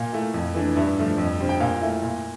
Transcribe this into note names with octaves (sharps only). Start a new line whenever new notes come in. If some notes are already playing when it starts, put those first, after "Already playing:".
Already playing: A#2 F5
A3 E4
F2
E3 A3 D4
G2 E5
F3 A3 D4
F2
D3 G3 C4
G5
A#2 F5
A3 E4
A#2